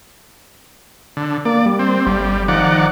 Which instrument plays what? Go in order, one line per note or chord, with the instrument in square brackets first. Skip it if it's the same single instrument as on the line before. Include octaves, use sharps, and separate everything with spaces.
[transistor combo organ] D3
[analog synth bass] A#3 [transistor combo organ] D5
[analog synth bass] G3
[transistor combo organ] C4
[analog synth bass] G1 [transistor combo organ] G3
[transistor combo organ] D#3 D5 F#5 [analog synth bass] F3